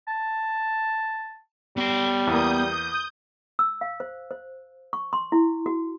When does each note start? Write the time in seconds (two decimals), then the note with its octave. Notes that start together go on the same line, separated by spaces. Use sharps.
0.08 A5
1.77 G3 B3 C6
2.27 E2 A#3 D#6 G6
3.59 E6
3.81 F5
4.00 C5
4.31 C5
4.93 C#6
5.13 C6
5.32 E4
5.66 F#4